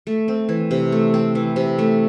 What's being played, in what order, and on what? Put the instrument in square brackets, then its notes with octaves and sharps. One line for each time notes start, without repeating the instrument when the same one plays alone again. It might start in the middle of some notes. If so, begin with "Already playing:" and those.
[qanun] A3
C4
E3
C3
A3
C4
E3
C3
A3